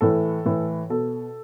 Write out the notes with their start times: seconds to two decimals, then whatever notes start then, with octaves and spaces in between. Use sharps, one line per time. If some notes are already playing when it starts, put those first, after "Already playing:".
0.01 A2 E3 A4
0.45 A2 E3
0.90 B2 A4